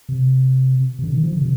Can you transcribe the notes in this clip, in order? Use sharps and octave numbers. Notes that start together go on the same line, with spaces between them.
C3
C3
D3
D#3
F3
D3
C3